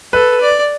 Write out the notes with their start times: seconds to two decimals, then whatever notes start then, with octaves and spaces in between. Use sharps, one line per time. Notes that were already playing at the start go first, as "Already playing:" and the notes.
0.13 A4 B4
0.41 D5